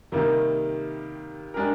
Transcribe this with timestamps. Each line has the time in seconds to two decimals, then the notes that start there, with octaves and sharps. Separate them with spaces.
0.12 C3 D#3 G3 A#3
1.54 G#3 D4 G4 A#4